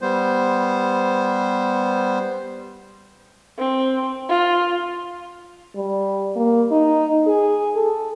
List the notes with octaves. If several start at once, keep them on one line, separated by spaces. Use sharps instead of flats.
G3 B3 C5
C4
F4
G3
A#3
D#4
G#4
A4